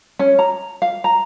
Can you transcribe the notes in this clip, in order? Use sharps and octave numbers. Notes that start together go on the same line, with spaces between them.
C#4
A#5
F5
A#5